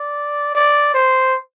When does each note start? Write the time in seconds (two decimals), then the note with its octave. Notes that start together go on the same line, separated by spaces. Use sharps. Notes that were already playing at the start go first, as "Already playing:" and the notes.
Already playing: D5
0.55 D5
0.94 C5